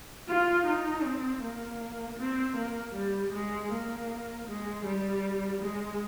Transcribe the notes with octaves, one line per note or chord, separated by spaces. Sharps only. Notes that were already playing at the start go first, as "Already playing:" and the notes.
F4
D#4
C4
A#3
C4
A#3
G3
G#3
A#3
G#3
G3
G#3